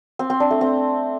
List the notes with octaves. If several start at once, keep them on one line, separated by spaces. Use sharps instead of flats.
C4
C4
D4
A3
C4